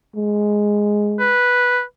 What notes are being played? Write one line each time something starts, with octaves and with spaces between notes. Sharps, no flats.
G#3
B4